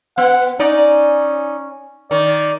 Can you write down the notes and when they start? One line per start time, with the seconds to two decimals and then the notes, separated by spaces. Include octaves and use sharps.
0.18 B3 F#5
0.60 C#4 D#4 D5
2.11 D#3 D5